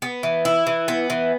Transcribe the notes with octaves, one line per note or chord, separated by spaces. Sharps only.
B3
E3
E4
E3
B3
E3